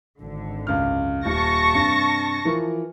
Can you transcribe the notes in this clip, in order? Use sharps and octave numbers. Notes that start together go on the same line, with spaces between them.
G#1 D3
C#2 F#2 F6
D#1 A5 C#6 A#6
G2 C3
E3 F3 A#4